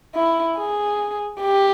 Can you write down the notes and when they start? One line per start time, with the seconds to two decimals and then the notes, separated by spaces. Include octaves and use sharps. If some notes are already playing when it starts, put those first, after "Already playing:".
0.15 E4
0.57 G#4
1.41 G4